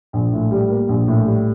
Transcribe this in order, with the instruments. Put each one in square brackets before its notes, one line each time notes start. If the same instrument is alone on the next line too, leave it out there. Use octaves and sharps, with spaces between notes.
[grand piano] A#1
A2
G3
A#3
A#1
A2
G3